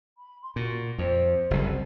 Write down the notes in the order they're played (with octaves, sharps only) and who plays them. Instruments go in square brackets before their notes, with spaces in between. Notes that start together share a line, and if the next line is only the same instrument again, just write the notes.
[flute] B5
C6
[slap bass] A#2 [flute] F#4
[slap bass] F2 [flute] C5
[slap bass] F#1 C2